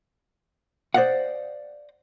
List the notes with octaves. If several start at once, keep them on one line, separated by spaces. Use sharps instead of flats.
C5 D5 D#5 F5 F#5